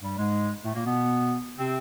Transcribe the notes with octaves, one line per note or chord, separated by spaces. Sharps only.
G2 G3
G#2 G#3
A2 A3
A#2 A#3
B2 B3
C3 C4